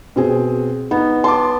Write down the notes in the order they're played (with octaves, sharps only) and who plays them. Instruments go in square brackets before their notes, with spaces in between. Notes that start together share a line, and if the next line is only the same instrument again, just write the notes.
[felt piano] B2 C4 G#4
[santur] B3 [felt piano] D#4
[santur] A5 [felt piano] C6 D6